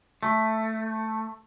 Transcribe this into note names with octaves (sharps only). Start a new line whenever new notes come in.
A3